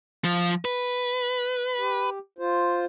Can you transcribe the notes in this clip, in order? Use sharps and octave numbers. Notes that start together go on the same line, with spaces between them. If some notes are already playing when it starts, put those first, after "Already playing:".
F3
B4
G4
F4 C5